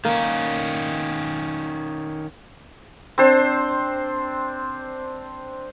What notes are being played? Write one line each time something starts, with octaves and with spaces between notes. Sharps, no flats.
D#3 A#3 C#4
C4 D4 C5